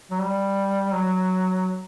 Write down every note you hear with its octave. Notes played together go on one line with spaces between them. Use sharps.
F#3
G3
F#3